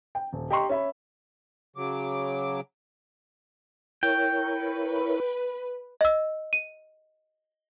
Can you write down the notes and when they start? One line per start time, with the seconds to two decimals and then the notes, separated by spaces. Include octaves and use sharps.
0.15 G5
0.33 D#1
0.50 G4 D#5 G5 A#5 C6 C#6
0.69 C#4 E5 B5
1.76 C#3 F#3 D6
4.03 E4 A#4 C#5 G5
4.45 B4
6.01 D#5 E6
6.53 D#7